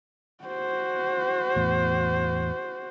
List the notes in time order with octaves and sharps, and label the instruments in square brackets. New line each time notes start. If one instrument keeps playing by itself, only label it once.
[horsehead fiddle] F#4 C5
[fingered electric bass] E2 A2